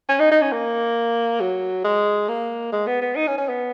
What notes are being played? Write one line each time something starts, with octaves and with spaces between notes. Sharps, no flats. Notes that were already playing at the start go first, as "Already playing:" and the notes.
C#4
D#4
D#4
C#4
A#3
F#3
G#3
A#3
G#3
B3
B3
D#4
C#4
C#4
B3